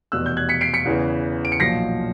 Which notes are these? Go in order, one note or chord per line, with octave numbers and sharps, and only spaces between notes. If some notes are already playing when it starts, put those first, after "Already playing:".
F1 E2 B2 E6 F#6
G6
F#6 G#6
B6 C#7
C7 D7
B6 C#7
E2 C#3 E3
D7
C#7
B1 A#2 F3 A#6 C7